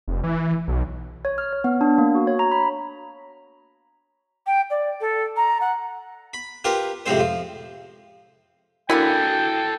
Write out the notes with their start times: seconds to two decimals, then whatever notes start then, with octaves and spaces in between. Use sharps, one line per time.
0.08 F1
0.24 E3
0.68 B1
1.25 C#5
1.38 F6
1.53 C#5
1.64 B3
1.81 D4
1.98 A#3
2.15 F#4
2.27 C#5
2.39 A#5
2.52 B5
4.46 G5
4.70 D5
5.00 A4
5.36 A#5
5.61 F#5
6.34 B5
6.64 F4 G4 A#4 B4
7.06 F2 A2 C3 G#3 C4 C5
7.19 F3
8.90 D3 A#3 E4 F#4 A4 G5 G#5 B5